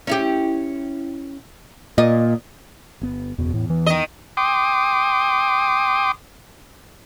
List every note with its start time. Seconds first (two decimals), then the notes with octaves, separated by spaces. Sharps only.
0.07 C#4 E4 G4
1.98 A#2 D#5
3.01 G1 B3
3.38 F#1 E2 B2
3.54 E2 A2
3.70 E3
3.87 D#3 D#5
4.37 G5 C6 D6 D#6